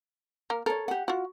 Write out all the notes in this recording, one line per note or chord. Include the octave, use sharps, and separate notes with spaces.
A#3 A#4
A4 A#4 C#5
G4 F#5
F4 F#4 F#5